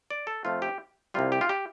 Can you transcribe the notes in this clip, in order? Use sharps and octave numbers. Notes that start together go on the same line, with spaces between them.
D5
A4
F2 F3 A3 F4
G4
C2 C3 G3 F4
G4
F4
G4